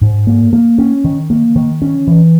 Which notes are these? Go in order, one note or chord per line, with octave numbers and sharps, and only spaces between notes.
G#2
A#3
A#3
C#4
D#3
A#3
D#3
C#4
E3